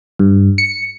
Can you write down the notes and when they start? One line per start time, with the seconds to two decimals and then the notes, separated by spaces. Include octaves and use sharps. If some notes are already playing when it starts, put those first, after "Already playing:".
0.19 G2
0.58 C#7